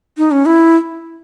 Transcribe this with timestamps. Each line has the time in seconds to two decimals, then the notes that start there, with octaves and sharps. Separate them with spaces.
0.18 D#4
0.31 C#4
0.46 E4